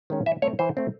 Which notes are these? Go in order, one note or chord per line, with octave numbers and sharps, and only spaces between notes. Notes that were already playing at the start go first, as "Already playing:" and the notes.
D#3 G#3 C#4
E3 E5
A3 C4 C#5
E3 C5
A3 C4